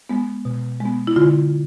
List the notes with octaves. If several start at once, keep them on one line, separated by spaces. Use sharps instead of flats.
G#3 B3
B2
G#3 B3
E4
D3 F4